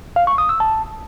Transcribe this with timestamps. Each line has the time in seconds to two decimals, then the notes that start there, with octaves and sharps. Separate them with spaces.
0.16 F5
0.27 C#6
0.38 D#6
0.49 E6
0.60 A5